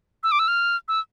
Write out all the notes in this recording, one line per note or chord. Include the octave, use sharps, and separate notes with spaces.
E6
D6
E6
F6
E6